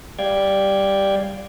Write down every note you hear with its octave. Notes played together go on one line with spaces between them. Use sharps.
G3 D5 F5 G5 G#6